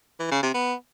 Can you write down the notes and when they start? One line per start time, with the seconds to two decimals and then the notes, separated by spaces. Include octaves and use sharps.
0.20 E3
0.31 C#3
0.43 C3
0.54 B3